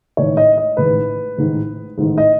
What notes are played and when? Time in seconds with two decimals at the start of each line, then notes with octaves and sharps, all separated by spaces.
0.17 A1 G#2 D#3 C#5
0.37 D#5
0.58 D#5
0.77 A1 G#2 D#3 B4
1.38 A1 G#2 D#3
1.98 A1 G#2 D#3
2.18 D#5